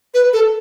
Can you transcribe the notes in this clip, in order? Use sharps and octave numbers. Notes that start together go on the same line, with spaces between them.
B4
A4